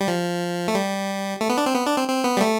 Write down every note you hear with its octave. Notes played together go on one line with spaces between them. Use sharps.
G3
F3
A3
G3
A3
B3
D4
C4
B3
D4
C4
C4
B3
G3
A3